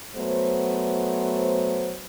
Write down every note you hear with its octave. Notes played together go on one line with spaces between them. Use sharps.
F#3 A3 B3 C5